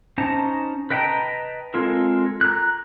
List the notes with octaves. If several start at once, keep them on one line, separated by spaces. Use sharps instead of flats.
C#4 D#4 C5 A5 A#5
B4 D#5 G5 A5 A#5
G#3 C4 F4 A4 A#4
A#5 F#6